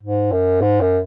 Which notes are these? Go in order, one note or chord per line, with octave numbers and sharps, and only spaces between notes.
G#2
F#2
G#2
F#2